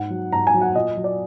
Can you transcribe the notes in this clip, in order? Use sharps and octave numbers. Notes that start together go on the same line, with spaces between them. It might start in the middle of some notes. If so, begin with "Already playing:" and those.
Already playing: G#2 F#5
F#3
G#2 A#5
G#5
F#3
F#5
A#2 D#5
F#3
D5